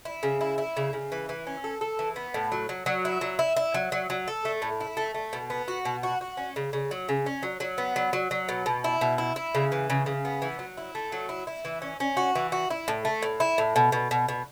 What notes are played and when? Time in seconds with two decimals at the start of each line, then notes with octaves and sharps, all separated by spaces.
0.05 E4
0.23 C#3
0.41 E4
0.58 E4
0.77 C#3
0.93 C#3
1.12 E3
1.29 E3
1.47 C#4
1.64 A4
1.81 A4
1.99 E3
2.16 B3
2.34 A2
2.52 F#3
2.69 F#3
2.86 F#3
3.05 E4
3.21 F#3
3.39 E4
3.57 E4
3.74 F#3
3.92 F#3
4.10 F#3
4.28 A4
4.45 A3
4.62 A2
4.80 E4
4.97 A3
5.14 A3
5.33 B2
5.50 B3
5.68 F#4
5.85 B2
6.03 F#4
6.21 F#4
6.37 C#4
6.56 C#3
6.73 C#3
6.91 F#3
7.09 C#3
7.26 C#4
7.43 F#3
7.60 F#3
7.78 B3
7.96 F#3
8.13 F#3
8.31 F#3
8.49 B2
8.66 B2
8.84 E4
9.01 B2
9.18 E4
9.36 E4
9.55 C#3
9.72 E3
9.90 C#3
10.06 C#3
10.25 B3
10.42 E3
10.59 F#3
10.77 E4
10.95 A3
11.12 F#3
11.29 E4
11.47 E4
11.65 E3
11.82 C#4
12.00 C#4
12.17 F#4
12.35 E3
12.52 F#4
12.70 E4
12.88 A2
13.05 A3
13.22 A2
13.40 E4
13.58 A2
13.76 B2
13.92 B2
14.11 B2
14.28 B2